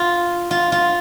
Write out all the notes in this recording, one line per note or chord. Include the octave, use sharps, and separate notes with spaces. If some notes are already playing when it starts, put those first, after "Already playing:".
Already playing: F4
F4
F4